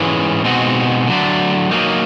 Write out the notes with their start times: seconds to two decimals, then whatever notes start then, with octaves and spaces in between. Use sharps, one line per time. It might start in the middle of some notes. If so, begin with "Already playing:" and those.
Already playing: G#2 E3 G#3 C#4
0.44 B2 G#3 C4 D#4 F#4
1.07 D3 F#3 A3 D4
1.71 F#3 A#3 D#4